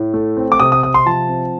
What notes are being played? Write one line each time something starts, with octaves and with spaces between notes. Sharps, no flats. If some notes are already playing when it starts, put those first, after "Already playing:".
Already playing: A2
A3
C4
D6
C3 D#6
D#6
C3 D#6
C6
F3 A5
C4